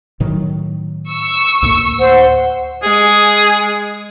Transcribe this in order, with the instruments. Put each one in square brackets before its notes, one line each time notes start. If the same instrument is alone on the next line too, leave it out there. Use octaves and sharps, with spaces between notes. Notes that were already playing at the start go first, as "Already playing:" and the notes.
[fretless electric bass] A2 D#3 F#3
[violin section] C#6 E6
[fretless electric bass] D2 A2 A#3
[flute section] C5 F#5
[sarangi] G#3 [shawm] G#4